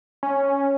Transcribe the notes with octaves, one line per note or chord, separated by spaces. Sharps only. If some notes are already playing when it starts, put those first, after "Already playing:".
C#4